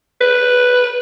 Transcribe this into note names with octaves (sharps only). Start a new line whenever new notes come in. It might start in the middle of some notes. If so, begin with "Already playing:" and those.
B4